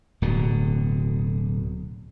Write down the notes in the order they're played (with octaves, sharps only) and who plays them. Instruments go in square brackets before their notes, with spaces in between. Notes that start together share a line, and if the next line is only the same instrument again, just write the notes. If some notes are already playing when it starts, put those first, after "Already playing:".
[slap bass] D1 B2 D3